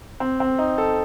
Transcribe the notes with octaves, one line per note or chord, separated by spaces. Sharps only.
C4
C4
D#4
A4